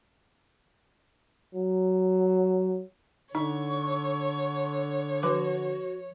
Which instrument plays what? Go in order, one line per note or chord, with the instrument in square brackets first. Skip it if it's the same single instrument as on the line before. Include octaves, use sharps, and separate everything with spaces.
[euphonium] F#3
[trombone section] D3 [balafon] D#4 [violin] C#5 [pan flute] C#6
[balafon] F3 B4 D6 [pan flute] F#4